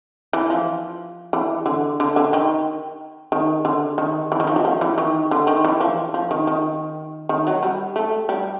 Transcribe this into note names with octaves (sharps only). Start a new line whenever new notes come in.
E3
F3
E3
D3
D3
D3
D#3
D#3
D3
D#3
E3
D#3
F3
F#3
F3
E3
D#3
D3
D#3
E3
F3
F3
D#3
D#3
D#3
F#3
G3
A3
G3